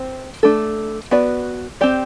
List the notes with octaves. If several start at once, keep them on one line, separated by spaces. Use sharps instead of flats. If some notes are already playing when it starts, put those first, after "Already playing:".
Already playing: C4 C5
A3 D4 A4
B3 F#4 B4 D5
C4 G4 D5